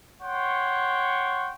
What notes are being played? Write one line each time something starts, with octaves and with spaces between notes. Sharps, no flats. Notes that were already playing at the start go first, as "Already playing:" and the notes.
C#5 F#5 G5 C6 C#6